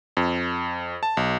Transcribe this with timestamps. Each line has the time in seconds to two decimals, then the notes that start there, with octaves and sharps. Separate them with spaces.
0.17 F2
1.03 A5
1.17 B1